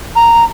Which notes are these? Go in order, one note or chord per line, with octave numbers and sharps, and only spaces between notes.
A#5